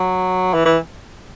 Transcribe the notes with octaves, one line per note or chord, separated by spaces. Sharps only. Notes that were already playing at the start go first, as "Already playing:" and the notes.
Already playing: F#3
E3
E3